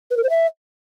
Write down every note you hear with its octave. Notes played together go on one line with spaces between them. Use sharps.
B4
A#4
C5
E5